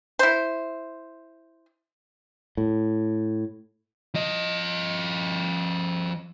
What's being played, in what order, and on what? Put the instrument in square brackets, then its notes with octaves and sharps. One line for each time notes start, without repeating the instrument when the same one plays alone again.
[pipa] E4 C5
[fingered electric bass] A2
[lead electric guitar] F3 D#5